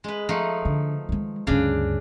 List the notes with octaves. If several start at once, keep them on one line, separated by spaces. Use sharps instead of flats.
G#3 B4
F3 A3 D#4
D3
D#3 G#3
D2 G2 C#3 D4